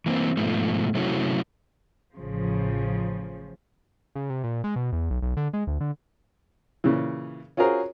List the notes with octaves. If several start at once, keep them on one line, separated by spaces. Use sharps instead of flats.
E3 A#3 C4
G#2 B2 F3 A3
C3 F#3 A3 C#4 E4 F#4
A1 C#3 F3
C#3
C3
A#2
G#3
B2
E2
B1
B1
D3
G#3
D2
D3
A#2 C#3 E3
C#4 F4 F#4 G#4 A#4 C5